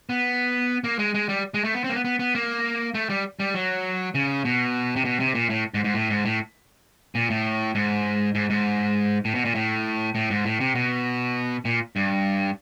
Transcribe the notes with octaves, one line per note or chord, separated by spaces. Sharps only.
B3
A#3
G#3
G#3
G3
G#3
A3
B3
C4
A#3
B3
B3
B3
A#3
A3
G3
G3
F#3
C#3
B2
C3
B2
C3
A#2
A2
G#2
G#2
A2
G#2
A2
A#2
A2
G#2
G#2
G#2
A2
B2
A#2
A2
A2
G#2
A2
C3
B2
A#2
G2